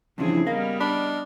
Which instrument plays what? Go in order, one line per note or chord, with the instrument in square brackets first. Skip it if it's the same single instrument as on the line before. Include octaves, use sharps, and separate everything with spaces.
[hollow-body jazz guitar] G2 E3 F3 [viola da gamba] C#3 C4 G#4 [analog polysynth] D4 E4
[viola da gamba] G3 B3 [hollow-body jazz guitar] A#4 F5 [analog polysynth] D#5 F6
[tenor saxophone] D4 [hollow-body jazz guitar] B5